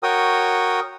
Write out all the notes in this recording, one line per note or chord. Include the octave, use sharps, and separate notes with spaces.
F#4 A#4 C#5 G5 D#6